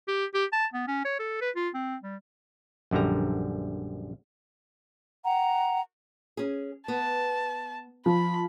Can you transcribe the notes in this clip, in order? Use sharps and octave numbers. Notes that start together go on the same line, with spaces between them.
G4
G4
A5
B3
C#4
C#5
A4
B4
F4
C4
G3
A#1 F#2 D3 G3 A#5
F#5 G5 A#5
C#4 G#4
B3 A5
F3 B5